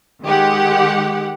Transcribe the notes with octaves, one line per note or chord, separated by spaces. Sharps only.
D#3 G#3 G4 F#5